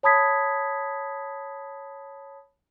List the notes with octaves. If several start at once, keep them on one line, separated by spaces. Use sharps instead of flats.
C#5 A5 B5 D#6 G#6 B6